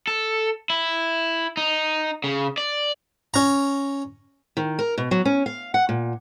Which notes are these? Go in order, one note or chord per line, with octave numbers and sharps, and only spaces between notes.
A4
E4
D#4
C#3
D5
C#4 A#5
D#3
A#4
B2
F#3
C#4
F5
F#5
A#2